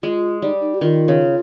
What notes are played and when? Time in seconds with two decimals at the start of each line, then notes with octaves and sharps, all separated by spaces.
0.03 G#3 F4
0.42 G3 D#4
0.61 D#4
0.74 G4
0.81 D#3 F4
1.08 C#3